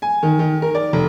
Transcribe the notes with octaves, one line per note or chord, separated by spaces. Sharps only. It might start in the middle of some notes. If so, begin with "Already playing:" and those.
G#5
D#3
D#3
A#4
D5
F1